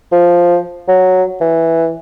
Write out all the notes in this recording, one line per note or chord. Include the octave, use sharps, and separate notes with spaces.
F3
F#3
E3